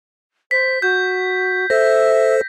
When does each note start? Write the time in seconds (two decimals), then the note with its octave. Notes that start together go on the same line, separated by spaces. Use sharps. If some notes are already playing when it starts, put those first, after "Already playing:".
0.51 C5 B6
0.82 F#4 G6
1.70 A4 C5 E5 A#6